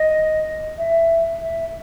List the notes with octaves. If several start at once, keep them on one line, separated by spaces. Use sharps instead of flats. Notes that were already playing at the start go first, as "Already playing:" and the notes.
Already playing: D#5
E5
E5